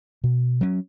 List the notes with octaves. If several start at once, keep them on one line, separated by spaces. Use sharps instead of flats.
B2
F#3 C#4